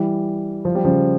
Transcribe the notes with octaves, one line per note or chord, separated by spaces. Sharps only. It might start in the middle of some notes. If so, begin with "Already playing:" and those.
Already playing: E3 G3
F3
G3
C#3 F3